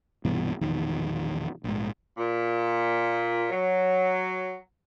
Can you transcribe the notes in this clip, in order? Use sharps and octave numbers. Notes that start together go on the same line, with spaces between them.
C2 G2 B2 E3
E1 A#1 E2 D#3
A#1 G#2
A#2
F#3